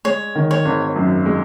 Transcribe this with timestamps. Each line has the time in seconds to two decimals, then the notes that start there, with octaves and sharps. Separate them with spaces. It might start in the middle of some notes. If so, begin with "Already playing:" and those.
0.05 G#3 C#5
0.35 D#3
0.51 C#5
0.65 G#1
0.96 F#2
1.25 G#3